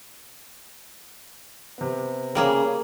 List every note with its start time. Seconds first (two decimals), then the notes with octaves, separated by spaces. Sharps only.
1.78 C3 B3
2.35 C#3 G3 A#3 G#4